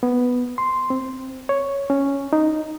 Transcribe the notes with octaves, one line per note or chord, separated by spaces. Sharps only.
B3
C6
C4
C#5
C#4
D#4